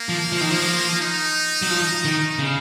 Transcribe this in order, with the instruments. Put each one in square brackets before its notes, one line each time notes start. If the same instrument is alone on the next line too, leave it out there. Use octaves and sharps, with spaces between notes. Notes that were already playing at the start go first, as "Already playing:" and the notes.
Already playing: [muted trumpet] A#3
[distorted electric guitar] F3
F3
D#3
F3
[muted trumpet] D#4
[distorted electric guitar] F#3
F3
D#3
C#3